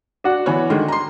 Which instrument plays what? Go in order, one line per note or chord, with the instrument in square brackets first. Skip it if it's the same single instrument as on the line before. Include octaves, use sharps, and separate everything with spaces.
[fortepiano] D4 F#4 F#5
[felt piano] E3 B3 C#5
D3 D#3 G#3
A#5 C6